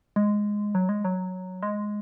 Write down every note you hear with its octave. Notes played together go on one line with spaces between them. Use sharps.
G#3
F#3
G#3
F#3
G#3